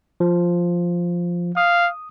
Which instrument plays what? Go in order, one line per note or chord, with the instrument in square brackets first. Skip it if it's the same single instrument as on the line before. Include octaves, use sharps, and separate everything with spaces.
[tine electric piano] F3
[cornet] F5 [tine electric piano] D#6